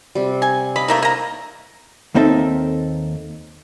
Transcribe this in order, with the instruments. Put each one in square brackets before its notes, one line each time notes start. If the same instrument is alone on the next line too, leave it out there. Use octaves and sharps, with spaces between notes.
[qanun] C3 G3
[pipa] G#5
[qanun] D#5 F5 D6 [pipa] B5
[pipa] A3 A#3 E4
[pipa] A#3 A#5 [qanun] D#5
[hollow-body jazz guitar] D#2 A#3 C4 D#4 A4 E5